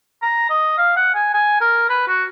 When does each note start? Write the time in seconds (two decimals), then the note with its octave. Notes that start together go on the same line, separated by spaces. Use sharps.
0.22 A#5
0.50 D#5
0.78 F5
0.97 F#5
1.14 G#5
1.34 G#5
1.61 A#4
1.89 B4
2.08 F#4